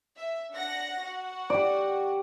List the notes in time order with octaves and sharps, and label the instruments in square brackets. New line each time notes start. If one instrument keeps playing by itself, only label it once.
[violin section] E5
D4 F#5 A#6
F#4 F#5
[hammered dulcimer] G4 D5